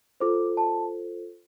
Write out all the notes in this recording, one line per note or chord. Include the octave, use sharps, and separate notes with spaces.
F4 A4 C5 D6
A5